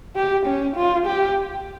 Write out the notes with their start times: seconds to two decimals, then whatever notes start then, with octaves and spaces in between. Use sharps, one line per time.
0.16 G4
0.46 C#4
0.76 F4
1.06 G4